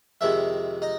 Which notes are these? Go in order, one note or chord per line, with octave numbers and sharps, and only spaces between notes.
F2 C3 D#3 G#3 E4 E5
D#4 D#5